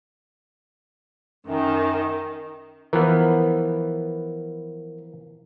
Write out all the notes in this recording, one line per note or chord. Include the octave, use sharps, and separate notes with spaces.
F#2 D#3
E3 F3 B3 A#4